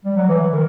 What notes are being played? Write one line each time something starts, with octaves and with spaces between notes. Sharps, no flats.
G3
F#3
E3
E3
D#3